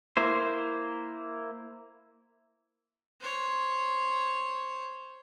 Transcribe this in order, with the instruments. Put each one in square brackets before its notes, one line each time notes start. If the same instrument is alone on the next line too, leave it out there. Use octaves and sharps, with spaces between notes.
[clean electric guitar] A#3 E4 C5
[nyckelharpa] C5 C#5